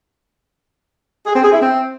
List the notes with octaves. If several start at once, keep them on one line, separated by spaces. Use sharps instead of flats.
G#4
C4
G#4
E4
C4